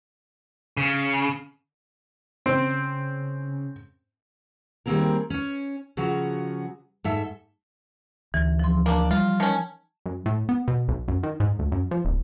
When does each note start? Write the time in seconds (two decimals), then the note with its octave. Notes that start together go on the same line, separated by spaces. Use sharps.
0.77 C#3
2.46 C#3 C4
4.86 D#3 G3 A#3 C4 G#4 A#4
5.30 C#4 C#5
5.97 C#3 F3 F#3 F#4 G#4
7.04 G#2 A4 E5
8.34 D2 E3
8.59 F3 C6
8.86 A#3 D4
9.11 G3 F4
9.40 D#3 C#4 A5
10.06 F#2
10.26 A2
10.49 B3
10.68 B2
10.88 B1
11.08 F#2
11.23 D#3
11.40 G#2
11.59 D2
11.72 F#2
11.91 F3
12.05 D1